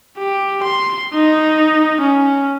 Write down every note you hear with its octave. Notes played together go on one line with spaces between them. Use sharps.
G4
C6
D#4
C#4